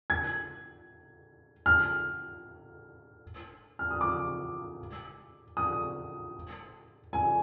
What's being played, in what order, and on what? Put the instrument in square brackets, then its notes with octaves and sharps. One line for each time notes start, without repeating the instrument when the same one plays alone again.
[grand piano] G#6
F6
F6
D#6
D6
D#6
G#5